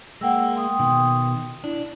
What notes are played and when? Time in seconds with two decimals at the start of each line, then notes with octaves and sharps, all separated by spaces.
0.21 G#3 A#3 F#5 G5 E6
0.55 G5 C6 D#6
0.79 B2 D#3
1.64 D4 E4